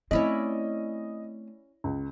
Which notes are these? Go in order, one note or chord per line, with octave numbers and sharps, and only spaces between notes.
A3 C4 C#4 E4 D5 D#5
C#2